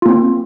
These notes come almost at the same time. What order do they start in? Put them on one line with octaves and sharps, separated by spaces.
F4 A#3 C4